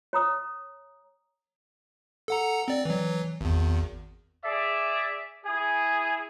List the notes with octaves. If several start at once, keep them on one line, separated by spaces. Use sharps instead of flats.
C#5 A#5 D#6
A4 F#5 A#5
C4 D5
E3 F#3
G#1 E2
G#4 D5 E5
E4 G#4